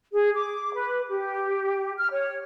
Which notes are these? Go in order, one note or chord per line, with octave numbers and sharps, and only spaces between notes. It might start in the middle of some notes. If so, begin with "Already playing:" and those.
G#4
D6
B4
G4
F6
C#5